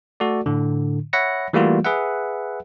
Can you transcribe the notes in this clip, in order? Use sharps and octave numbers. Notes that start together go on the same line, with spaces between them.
A3 F#4 A4 D5
A2 D3
C#5 E5 F#5 B5 A#6 C#7
E3 G3 A3 A#3 F4 F#4
G#4 B4 E5 F#5